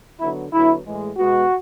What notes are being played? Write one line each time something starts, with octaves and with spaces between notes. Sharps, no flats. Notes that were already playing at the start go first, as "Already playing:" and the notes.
D3 F#3 B3 E4
D3 F#3 B3 E4
A2 E3 G#3
B2 G#3 B3 F#4